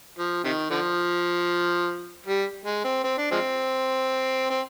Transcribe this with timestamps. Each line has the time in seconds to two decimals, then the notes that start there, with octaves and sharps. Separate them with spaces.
0.18 F3
0.44 C3 D#3
0.71 D3 F3
2.26 G3
2.66 G#3
2.84 C4
3.04 C4
3.18 D4
3.31 F3 G#3 C4
4.50 C4